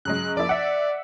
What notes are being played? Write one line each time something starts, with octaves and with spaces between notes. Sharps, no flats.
C#3 F#3 G#3 F#6
F3 A#3 E4 D5
E5 F#5